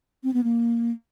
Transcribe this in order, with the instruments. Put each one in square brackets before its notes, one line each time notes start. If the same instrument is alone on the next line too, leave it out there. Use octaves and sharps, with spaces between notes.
[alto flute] C4
B3
A#3